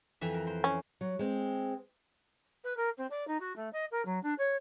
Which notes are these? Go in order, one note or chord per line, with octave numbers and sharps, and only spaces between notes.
F2 E3 E5
A#4
C5
C#4
F#3
G#3 C4
B4
A#4
C4
D5
D#4
F#4
A3
D#5
A#4
F#3
D4
C#5